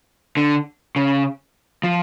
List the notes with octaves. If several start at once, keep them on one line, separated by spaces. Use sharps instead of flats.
D3
C#3
F3